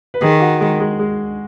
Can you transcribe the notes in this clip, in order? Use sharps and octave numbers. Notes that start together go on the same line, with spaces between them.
B4
D#3 G#4
F#4
G#3
G#3
G#3